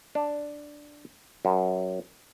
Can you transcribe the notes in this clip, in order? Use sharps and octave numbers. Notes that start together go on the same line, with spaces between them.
D4
F#2